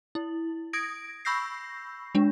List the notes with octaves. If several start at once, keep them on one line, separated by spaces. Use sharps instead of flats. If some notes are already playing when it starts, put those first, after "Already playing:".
E4
D#6 G#6 A#6 D7
B5 C#6 E6 G6 A#6 C7
G#3 D4